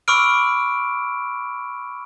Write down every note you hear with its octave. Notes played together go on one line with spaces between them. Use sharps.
B5 C#6 D6 E6 F6 D7